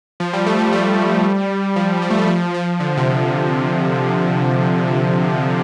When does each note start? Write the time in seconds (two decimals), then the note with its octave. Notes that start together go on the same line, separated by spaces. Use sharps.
0.20 F3
0.33 G3
0.46 A3
0.59 A3
0.72 G3
1.76 F3
2.02 G3
2.10 A3
2.18 G3
2.27 F3
2.54 F3
2.80 D3
2.97 C3